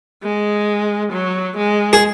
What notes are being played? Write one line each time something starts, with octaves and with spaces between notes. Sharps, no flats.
G#3
F#3
G#3
G#4